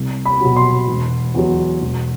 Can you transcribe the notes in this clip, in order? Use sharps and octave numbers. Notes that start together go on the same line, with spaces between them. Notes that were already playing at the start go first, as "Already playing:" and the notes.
Already playing: C2
B5
B2 F#3
C6
E1
E2 B2 F#3
E1